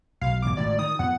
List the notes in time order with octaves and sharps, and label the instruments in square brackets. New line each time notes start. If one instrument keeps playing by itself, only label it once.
[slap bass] B1 [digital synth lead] F5
[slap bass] B1 E2 G#2 [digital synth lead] D6
[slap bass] G#1 A2 [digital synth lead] D5
[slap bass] D#3 [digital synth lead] D#6
[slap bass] F2 B3 [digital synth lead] F#5